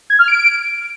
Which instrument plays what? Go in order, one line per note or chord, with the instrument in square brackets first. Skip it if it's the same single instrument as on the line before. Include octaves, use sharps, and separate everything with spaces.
[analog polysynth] G#6
F6
D7